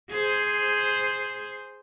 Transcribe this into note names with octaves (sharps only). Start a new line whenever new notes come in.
G#4 C5